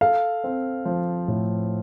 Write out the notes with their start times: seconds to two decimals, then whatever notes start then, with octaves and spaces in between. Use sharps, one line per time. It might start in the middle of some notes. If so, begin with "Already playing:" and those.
0.01 A4 F5
0.44 C4
0.85 F3
1.28 A2